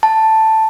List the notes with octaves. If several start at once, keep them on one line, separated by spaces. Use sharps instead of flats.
A5